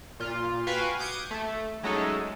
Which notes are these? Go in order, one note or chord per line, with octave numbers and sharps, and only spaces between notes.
A#2 F4
F#4 B4 F5 G5 G#5
D6 D#6 G6 G#6 C#7 D#7
A3
F#3 G#3 A3 C#4 D#4 A4